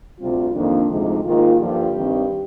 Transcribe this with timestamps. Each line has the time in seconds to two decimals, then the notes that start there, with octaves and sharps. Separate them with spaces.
0.20 D2 C3 G3 C4 F4
0.55 F2 D#3 A#3 D4
0.90 D2 C3 F3 G#3 D#4
1.25 G#2 D#3 A#3 F4
1.60 G2 D3 F3 A#3 G4
1.96 G2 D#3 G3 C4